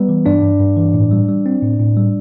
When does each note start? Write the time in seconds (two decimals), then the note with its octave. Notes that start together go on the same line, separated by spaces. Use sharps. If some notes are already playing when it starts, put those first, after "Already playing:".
Already playing: G3 B3 B4
0.09 E3
0.26 G2 D4 D5
0.43 G2
0.60 G2
0.77 E3
0.94 A2
1.11 G3
1.29 G3
1.46 C4
1.62 A2
1.80 A2
1.97 G3